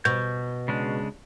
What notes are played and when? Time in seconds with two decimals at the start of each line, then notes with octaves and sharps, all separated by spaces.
0.05 B2 G6
0.68 C#3 G#3 D4